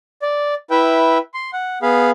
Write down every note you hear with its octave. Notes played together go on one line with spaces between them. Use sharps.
D5
E4 B4 E5 G5
C6
F#5
B3 G#4 F5 B5